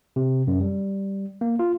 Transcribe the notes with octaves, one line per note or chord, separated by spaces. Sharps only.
C3
F#2
G3
A#3
F4